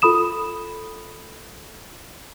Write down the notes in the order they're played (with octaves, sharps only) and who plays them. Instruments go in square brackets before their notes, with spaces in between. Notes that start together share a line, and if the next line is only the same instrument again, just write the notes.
[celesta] F4 A4 B5 D#6 E7